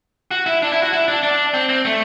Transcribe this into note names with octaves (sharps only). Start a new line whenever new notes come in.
F#4
E4
D4
E4
F#4
E4
D4
D4
C4
C4
A3